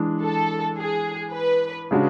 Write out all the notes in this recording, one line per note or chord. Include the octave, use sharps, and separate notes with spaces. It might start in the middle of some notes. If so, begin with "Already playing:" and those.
Already playing: E3 G#3 D4
A4
G#4
B4
C#3 G#3 D4 F#4